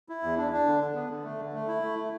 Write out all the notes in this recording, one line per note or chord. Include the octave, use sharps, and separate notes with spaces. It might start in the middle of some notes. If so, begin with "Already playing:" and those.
E4
E2
D4
D4
D3
D3
B3
D3
A3
D3
A3
E4
A3